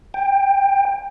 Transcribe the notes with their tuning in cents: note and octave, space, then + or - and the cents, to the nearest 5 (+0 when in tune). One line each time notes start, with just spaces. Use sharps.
G5 +20